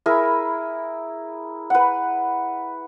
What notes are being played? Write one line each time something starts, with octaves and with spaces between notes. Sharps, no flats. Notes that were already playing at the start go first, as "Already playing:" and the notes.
E4 G#4 A#4 B5
B4 F#5